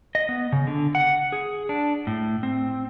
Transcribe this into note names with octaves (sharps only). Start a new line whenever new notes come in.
D#5
B3
C#3
D3
F#5
G#4
D4
A2
C4